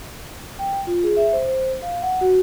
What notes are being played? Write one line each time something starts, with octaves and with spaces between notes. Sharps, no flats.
G5
F4
G#4
E5
C5
C5
F5
F#5
F#4